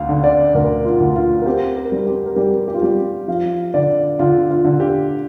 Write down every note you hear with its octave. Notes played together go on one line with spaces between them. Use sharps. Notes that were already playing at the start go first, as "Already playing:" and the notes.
Already playing: D2 F5
D3
D5
D2 A#4
F4
D2
F4
A#4
C4 G4
A#4
G3
G4
A#4
G3 G4
G4
F4
G3 G4
F3 F5
D3 D5
D3 F4
F4
D3
G4